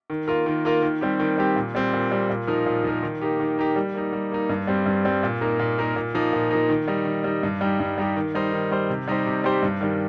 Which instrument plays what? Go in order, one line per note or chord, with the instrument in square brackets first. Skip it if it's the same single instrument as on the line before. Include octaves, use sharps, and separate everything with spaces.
[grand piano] D#3
A#3 F4 A#4
D#3
A#3 F4 A#4
D#3
G3 C4 G4
D#3
G3 C4 G4
A#2
G3 C4
A#2
G3 C4
A#2
F3 D#4 A#4
A#2
F3 D#4 A#4
D#3
A#3 D#4 G4
D#3
A#3 D#4 G4
G3
A#3 D#4
G3
A#3 D#4
G2
G3 C4
G2
G3 C4
A#2
A#3 D#4 A#4
A#2
A#3 D#4 A#4
A#2
F3 A#3 D#4
A#2
F3 A#3 D#4
D#3
G3 D#4
D#3
G3 D#4
G2
G3 D#4 G4
G2
G3 D#4 G4
D#3
G3 D#4 C5
D#3
G3 D#4 C5
C3
G3 D#4 G4 C5
C3
G3 D#4 G4 C5
G2
D#3 G3